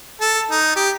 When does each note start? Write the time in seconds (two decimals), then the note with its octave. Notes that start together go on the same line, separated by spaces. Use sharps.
0.21 A4
0.51 D#4
0.76 G4